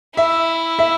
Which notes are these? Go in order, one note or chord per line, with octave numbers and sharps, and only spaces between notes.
E4 E5
E5